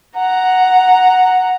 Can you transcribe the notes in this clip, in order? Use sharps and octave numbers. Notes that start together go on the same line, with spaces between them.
F#5 A#5